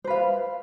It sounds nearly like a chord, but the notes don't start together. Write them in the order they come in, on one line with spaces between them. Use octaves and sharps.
C5 B4 F5